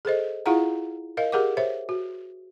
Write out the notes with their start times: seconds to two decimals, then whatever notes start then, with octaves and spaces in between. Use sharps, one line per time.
0.05 G#4 A4 C5 D#5
0.46 E4 F4 G#4 F5 F#5 A#5
1.17 A#4 D#5 F5
1.32 G4 G#4 A#4 F#5 D6
1.57 C5 C#5 E5
1.89 F#4